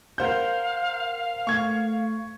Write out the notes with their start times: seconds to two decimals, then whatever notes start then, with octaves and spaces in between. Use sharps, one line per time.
0.18 A#4 C5 F5 F#5 G6
1.47 A3 C#6 G#6